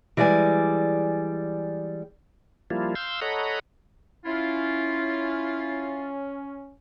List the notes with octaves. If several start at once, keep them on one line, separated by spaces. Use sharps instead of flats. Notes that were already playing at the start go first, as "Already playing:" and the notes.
E3 G3 G#3 D5 G#5
F3 G3 A#3 E4 F4
F5 C6 E6 G6
A4 C#5 D#5 F#5 A#5 B5
C#4 E4 F4